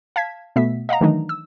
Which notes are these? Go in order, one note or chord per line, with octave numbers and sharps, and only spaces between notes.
F5 A5 G#6 B6
B2 A3 B3 E5 B6
D#5 F5 F#5 A#5
D#3 E3 F#3 A3 D4 D#4
E6